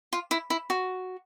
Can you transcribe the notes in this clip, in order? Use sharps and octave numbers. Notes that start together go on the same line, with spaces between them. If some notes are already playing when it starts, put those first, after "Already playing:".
F4
E4
E4
F#4